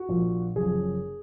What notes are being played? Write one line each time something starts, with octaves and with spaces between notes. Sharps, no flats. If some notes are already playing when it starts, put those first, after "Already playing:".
Already playing: F#4
A#1 A#2 F3
F#1 F#2 F3 G#4